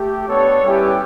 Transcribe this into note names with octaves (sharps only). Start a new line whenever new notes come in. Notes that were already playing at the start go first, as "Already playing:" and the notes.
Already playing: A3 G4
B3 D4 A4 C#5
G3 C#4 E4 G4 B4